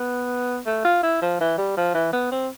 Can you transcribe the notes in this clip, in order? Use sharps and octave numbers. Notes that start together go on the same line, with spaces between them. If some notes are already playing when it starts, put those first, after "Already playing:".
Already playing: B3
A3
F4
E4
F3
E3
G3
F3
E3
B3
C4